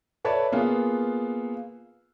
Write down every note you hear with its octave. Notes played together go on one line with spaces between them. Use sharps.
A4 B4 C#5 D5 E5 A5
A#3 B3 F4 G#4